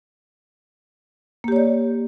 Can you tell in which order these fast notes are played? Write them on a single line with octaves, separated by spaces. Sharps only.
A#3 G4 C#5 D5